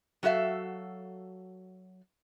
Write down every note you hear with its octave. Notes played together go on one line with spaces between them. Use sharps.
F#3 F#4 A4 E5 F5